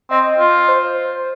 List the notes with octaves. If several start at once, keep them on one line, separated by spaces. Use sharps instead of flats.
C4 D#5
F4
C5